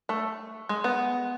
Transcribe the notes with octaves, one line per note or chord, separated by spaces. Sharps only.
A3
G#3
B3